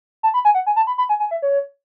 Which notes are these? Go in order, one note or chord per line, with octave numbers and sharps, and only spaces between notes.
A5
B5
G#5
F#5
G#5
A5
B5
B5
G#5
G#5
E5
C#5